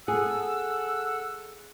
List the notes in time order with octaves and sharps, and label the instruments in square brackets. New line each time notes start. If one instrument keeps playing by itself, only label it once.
[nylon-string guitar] G#4 [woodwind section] A4 F#5 E6